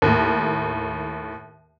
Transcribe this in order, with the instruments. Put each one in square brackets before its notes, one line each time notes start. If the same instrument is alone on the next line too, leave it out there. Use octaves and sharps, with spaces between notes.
[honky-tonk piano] D#2 A2